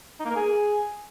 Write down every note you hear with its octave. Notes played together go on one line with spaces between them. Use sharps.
D#4
A#3
A#4
G#4